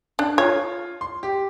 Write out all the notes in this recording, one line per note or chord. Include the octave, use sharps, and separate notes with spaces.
D4 F#6
F4 C#5
C6
G4